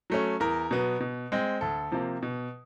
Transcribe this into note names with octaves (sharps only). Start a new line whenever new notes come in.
F#3 A3 C#4
E2 A#4
B2 F#3 B3
B2
G#3 C4
D2 A4
C3 F3 A#3
B2